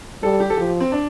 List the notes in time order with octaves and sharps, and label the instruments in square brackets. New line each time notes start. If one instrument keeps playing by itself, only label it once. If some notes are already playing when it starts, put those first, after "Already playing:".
[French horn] G3 [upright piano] A4
[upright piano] G4
A4
[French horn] F3 [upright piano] G4
[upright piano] C4
D4